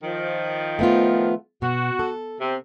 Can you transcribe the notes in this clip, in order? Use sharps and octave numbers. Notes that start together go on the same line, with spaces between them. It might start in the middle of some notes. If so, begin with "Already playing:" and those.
D#3 F3
A3 B3 F4
B2 F#4
A4
C3 C4